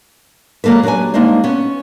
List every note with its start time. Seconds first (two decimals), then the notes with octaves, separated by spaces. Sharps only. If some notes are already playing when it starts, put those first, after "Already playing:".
0.64 F#3 G#3 A#3 A4 B4
0.83 F#3 D4 G4 B4 G#5
1.14 G3 G#3 A#3 D4 D#4 C5
1.44 B3 C#4